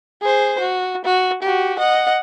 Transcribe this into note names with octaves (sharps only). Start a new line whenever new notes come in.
G#4 C5
F#4
F#4
F#4 G4
D#5 F#5